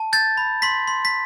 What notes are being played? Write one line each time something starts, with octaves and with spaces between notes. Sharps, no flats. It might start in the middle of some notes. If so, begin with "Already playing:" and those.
Already playing: A5
G6 A6
B5
C6 B6
C6
B6